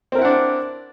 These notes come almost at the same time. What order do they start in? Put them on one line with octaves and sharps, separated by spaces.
C4 A#4 E4 F#5 D4